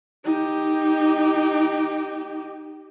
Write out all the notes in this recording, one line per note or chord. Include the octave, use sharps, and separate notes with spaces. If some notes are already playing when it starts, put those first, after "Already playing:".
D#4 G4